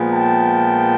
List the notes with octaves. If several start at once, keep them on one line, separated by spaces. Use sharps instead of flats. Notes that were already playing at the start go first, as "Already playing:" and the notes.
Already playing: A#2 F3 G#3 B3
G5 A5